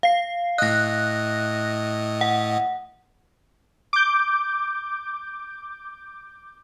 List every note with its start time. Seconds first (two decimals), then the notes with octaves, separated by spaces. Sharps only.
0.03 F5 C7
0.58 A2 D#5 F#6 A#6
2.21 F#5
3.93 D6 G6